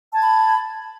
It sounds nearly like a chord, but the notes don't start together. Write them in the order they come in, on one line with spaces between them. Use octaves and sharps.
A5 G#6 B5